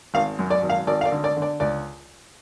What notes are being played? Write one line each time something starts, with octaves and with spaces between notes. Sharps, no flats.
G#1 F5
F#2
D5
G#1
F5
G#1 D5
F5
D5
D3
D5
D3
D5
C#2 D5